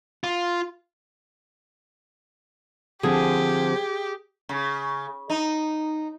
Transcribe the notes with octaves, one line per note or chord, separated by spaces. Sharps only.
F4
D3 F3 C4 G4 G#4
C#3
D#4